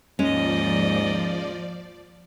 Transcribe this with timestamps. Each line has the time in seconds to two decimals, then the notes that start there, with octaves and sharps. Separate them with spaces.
0.19 D#2 G#2 F3 G#3 C#4 D5 D#5